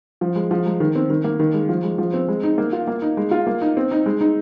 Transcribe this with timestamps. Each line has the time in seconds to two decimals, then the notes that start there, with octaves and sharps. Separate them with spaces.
0.21 F3
0.36 G#3
0.51 F3
0.66 G#3
0.80 D#3
0.95 C4
1.10 D#3
1.24 A#3
1.40 D#3
1.54 G#3
1.69 F3
1.84 G#3
1.98 F3
2.14 C4
2.28 G#3
2.43 D#4
2.58 A#3
2.73 F4
2.87 A#3
3.02 D#4
3.17 G#3
3.31 F4
3.47 A#3
3.62 D#4
3.77 C4
3.91 D#4
4.06 G#3
4.21 D#4